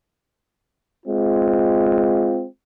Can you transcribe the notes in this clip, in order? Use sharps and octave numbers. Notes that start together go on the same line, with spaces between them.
G#3 C4 F4